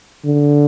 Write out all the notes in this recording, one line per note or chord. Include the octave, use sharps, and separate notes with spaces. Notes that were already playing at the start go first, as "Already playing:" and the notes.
D3